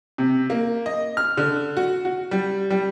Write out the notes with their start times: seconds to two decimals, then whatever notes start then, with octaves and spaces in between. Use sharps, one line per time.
0.18 C3
0.50 A#3
0.86 D#5
1.17 F6
1.37 D3
1.77 F#4
2.05 F#4
2.31 G3
2.70 G3